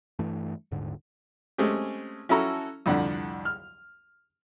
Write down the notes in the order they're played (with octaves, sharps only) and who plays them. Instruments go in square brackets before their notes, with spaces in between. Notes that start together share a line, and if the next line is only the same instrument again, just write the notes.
[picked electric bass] G2 E3 A3
D#1 G#2 D3
[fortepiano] G#3 A3 C4 C#4 G4
C#4 E4 F#4 A4 A#5
C2 F2 D3 D4 F#5
F6